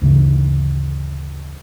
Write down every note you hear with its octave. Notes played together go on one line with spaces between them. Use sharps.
D2 G2 C#3 E3